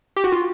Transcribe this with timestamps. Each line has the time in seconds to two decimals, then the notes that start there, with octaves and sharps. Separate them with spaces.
0.16 G4
0.24 F#4
0.32 F4